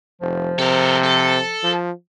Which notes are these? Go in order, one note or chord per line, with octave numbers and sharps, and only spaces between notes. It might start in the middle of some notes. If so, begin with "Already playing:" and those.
F1 F3
C3 A4 A#4
A4
F3